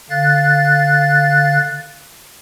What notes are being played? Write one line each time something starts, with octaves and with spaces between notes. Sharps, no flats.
D3 F5 F#6 A6